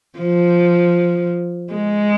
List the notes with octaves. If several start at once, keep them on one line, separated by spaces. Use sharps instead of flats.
F3
G#3